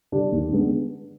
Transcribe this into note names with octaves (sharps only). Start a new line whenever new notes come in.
D3 G3 D4
D#2
D3 G#3 B3 D4